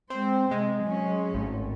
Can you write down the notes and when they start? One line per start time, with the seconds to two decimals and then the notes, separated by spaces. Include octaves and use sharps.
0.10 G#3 C4 C5
0.51 C3 G#3
0.84 F#3 C#4
1.34 G#1 A2